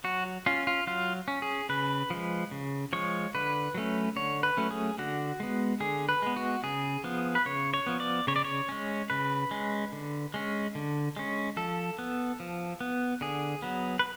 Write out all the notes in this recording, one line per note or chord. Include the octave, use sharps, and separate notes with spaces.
F#3 F#4
C#4 F4
F4
F#3 F4
C#4
G#4
C#3 B4
F3 G#3
C#3
F3 G#3 C#5
D3 B4
F#3 A3 C#4
D3 C#5
B4
F#3 A3 C#4
G#4
D3 F#4
G#3 B3
D3 G#4
B4
G#3 B3
F#4
C#3 G#4
F3 B3
B4
C#3 C#5
C#5
F3 B3
D5
C#3 C#5
D5
C#5
G#3 C#4
C#3 B4
G#3 C#4
D3
G#3 C#4
D3
G#3 C#4
F3 A4
B3
F3
B3
D3 G#4
F#3 B3
B4